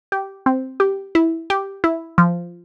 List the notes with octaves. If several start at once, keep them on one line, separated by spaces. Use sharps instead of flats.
G4
C4
G4
E4
G4
E4
F3